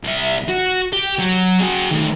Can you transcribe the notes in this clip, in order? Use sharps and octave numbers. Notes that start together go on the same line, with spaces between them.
C2 E5
F#4
G4
F#3
F#4 G#4
D#3 A3